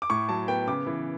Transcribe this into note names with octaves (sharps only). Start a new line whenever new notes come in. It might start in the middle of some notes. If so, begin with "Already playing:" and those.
D6
A2 C#6
F#3 A5
B3 G5
C#3 D6
E3